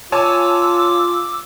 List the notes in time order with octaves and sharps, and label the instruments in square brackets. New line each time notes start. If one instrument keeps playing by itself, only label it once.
[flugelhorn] F4 [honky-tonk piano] C#5 G#5 A5 [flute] D6 [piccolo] E6